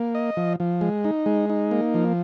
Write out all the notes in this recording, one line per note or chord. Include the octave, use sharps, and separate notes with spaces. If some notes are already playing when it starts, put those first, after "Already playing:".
Already playing: A#3
D#5
F3
F3
G#3
D#4
G#3
D#4
A#3
F3